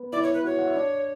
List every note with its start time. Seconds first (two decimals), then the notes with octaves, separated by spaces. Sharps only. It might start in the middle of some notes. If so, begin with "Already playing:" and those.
Already playing: B3 B4
0.12 E4 D5
0.23 C#5
0.34 B4
0.44 F#4 C#5
0.59 F#5
0.67 E5
0.75 D4 D5